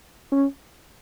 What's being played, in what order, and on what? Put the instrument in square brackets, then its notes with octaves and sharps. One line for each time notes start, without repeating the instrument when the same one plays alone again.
[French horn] C#4